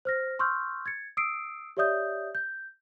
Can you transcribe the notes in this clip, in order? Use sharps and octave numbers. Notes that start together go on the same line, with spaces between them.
C5 F6 A#6
C6 C#6 E6 F6 G6
G#6 A6 C#7
D#6 E6 C7 D7
G4 C#5 D5 E5 D#6 G6
G6